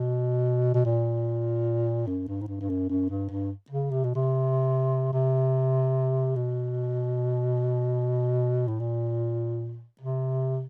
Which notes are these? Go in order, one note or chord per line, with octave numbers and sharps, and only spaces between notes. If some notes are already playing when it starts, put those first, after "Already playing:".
Already playing: B2
B2
A#2
F#2
G2
G#2
G2
G2
F#2
F#2
G2
G2
C#3
C3
B2
C3
C3
B2
A2
A#2
C3